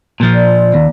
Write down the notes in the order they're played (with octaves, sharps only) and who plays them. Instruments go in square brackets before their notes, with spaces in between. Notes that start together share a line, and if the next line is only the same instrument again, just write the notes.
[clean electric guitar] A#2 F3
[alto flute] D5
[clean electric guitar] D#2